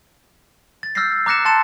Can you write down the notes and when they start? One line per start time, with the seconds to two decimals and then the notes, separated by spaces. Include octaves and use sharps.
0.83 A6
0.95 E6 F6 G6 A6 A#6 C7
1.26 A#5 D6 F#6 A#6 C#7 E7
1.45 A5 C6 A6 C#7 E7